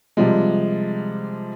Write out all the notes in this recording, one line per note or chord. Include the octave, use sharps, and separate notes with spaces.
C3 F3 G3 G#3